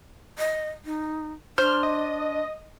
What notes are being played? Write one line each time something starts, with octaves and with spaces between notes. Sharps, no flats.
D#5
D#4
D4 C5 F6
D#5